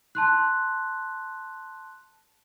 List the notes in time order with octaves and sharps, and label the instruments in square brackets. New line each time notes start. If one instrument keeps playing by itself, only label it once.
[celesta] A5 C6 F#6